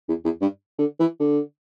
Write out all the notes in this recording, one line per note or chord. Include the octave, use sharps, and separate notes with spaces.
E2
E2
G2
D3
E3
D3